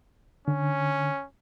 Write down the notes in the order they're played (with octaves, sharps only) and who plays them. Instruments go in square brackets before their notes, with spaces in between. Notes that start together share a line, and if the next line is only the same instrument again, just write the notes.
[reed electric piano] D3 [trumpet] C#4